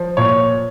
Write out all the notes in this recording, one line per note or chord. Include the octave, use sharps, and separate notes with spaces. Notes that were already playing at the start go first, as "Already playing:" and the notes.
Already playing: F3
A#2 C#5